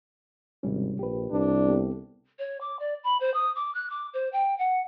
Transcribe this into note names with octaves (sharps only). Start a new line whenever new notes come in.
G#1 C3 G3 C#4
A#1 G4 B4
C2 D4
B3 G4 A4
C#5
D6
D5
B5
C5
D#6
D6
F#6
D6
C5
G5
F#5